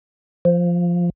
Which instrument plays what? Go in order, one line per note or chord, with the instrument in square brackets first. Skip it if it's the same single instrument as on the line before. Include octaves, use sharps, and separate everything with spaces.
[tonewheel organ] F3